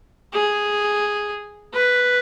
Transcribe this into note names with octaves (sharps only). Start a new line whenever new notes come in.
G#4
B4